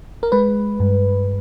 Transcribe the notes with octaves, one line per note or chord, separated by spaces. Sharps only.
A#4
G#3 B4
G2